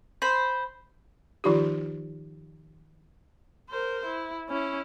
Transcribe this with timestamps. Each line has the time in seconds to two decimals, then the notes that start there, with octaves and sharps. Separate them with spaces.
0.22 C5 B5
1.44 D#3 F3 D#4 F4 G4
3.70 A#4 C5
4.06 E4
4.49 C#4 E4